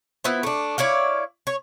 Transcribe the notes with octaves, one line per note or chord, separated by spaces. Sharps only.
B3 E4 F4 C5
A3 D4
E4 C#5 D5 F5
C#5